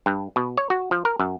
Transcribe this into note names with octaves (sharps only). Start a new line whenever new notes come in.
G2
B2
C#5
F#4
F3
A#4
F#2